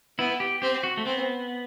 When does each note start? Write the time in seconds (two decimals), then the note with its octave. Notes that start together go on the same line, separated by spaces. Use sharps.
0.19 B3 E4
0.40 G4
0.62 C4 G4
0.83 F#4
0.97 A3
1.05 B3 C4